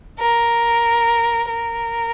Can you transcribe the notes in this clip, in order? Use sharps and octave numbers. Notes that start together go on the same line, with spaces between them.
A#4
A#4